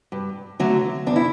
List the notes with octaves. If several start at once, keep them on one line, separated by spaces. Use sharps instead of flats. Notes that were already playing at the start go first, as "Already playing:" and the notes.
G2
D3 F#3 A3
E2 D4
E4